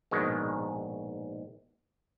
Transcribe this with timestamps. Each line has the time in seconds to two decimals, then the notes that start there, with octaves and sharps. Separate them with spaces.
0.11 A#1 G#2 B2 D#3 G#3